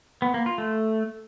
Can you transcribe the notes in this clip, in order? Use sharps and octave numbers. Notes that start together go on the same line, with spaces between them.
B3
A#3
F4
A3